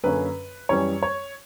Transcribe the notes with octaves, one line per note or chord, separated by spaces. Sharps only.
F#2 D3 A#3 C#4 B4
F#2 E3 G3 C#4 C#5
C#5